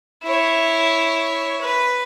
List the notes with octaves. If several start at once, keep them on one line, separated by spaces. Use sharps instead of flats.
E4 C#5
B4